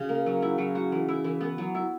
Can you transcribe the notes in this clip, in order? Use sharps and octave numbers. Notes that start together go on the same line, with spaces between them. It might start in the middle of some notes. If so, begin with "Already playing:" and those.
Already playing: C#3 F#4
A#3
F#3
E4
F#3
F#4
E3
E4
E3
B3
F#3
E4